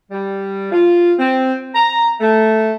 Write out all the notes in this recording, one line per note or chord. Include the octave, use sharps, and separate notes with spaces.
G3
F4
C4
A#5
A3